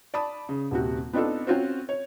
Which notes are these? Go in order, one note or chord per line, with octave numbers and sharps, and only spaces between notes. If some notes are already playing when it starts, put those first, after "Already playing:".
D5 A5 B5 D#6
C#3
D#1 C3 F#4
B3 C4 D4 D#4 F4 A4
C4 C#4 F4 F#4 C5
C#5